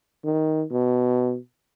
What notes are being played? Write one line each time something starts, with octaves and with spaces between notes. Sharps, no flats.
D#3
B2